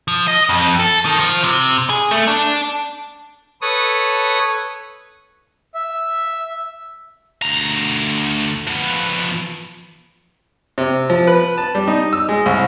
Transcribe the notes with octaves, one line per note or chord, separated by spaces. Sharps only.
F3
D#5
F2
A4
D#3
F3
C3
G#4
A3
D4
A4 B4 C#5 D#6
E5
D2 A#5
F3 B3
C3
F3
B4
A5
G3
D#4
E6
G#3
C2